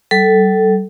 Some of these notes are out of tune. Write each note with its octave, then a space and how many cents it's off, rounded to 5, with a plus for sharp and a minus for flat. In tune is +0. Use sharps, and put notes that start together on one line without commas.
G3 -40 A4 +0